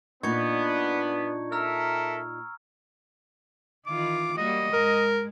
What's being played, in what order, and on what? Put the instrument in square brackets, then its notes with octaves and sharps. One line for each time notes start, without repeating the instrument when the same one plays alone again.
[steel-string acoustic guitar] A#2 D#4 [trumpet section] B3 [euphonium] D4 [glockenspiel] C#6 G#6 C#7
[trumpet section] A4 A#4 E5 [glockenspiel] A#5 E6 F6
[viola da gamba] D#3 E3 F4 [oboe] D6
[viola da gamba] G3 A#3 F#4 [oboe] D#5
[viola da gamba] G#2 G#3 [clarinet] A#4